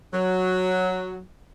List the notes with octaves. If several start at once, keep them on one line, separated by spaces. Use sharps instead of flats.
F#3